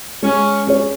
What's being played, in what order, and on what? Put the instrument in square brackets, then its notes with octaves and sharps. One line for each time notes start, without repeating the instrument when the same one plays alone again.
[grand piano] G#3 [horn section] C#4
[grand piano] C#4 G#4 C#5